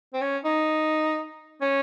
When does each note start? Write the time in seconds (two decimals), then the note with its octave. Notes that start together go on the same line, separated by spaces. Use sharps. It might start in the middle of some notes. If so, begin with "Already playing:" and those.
0.13 C4
0.21 C#4
0.45 D#4
1.61 C#4